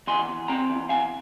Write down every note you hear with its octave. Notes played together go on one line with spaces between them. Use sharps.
E2 G#5 C6
E2
C4 G5 A#5
E2
E2 F5 G#5